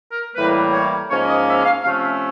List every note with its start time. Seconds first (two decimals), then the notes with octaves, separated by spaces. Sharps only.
0.12 A#4
0.36 A2 E3 G3 A#3 B4
0.73 C#5
1.10 G#2 F3 A#3 C#4 C#5
1.28 D#5
1.48 E5
1.65 F5
1.84 C3 F3 A3 C#4 F5
2.03 E5